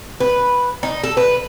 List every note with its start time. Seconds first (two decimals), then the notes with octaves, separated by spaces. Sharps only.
0.20 B4
0.83 D#4
1.04 A4
1.17 B4